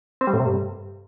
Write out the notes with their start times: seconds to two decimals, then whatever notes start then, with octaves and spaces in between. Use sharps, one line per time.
0.21 C4
0.27 G3
0.33 A2
0.40 C3
0.46 G2